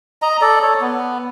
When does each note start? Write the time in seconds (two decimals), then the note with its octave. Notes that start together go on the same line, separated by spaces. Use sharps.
0.22 D#5 A#5
0.41 A4 D5
0.62 A4 C#5
0.81 B3